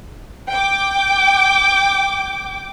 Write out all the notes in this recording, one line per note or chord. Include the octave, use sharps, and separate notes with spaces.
G5 D6